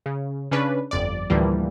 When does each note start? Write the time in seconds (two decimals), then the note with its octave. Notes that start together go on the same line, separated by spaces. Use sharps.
0.06 C#3
0.51 C#3 C#4 D4 B4
0.91 G1 F2 D5
1.30 D2 A2 E3 F3 G3 A#3